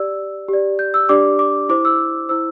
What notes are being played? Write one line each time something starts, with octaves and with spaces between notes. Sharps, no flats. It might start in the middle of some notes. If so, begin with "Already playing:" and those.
Already playing: G4 D5 E6
G4 D5
G6
E6
D4 G4 D5 D6
D6
E4 C5 D6
E6
E4 C5 E6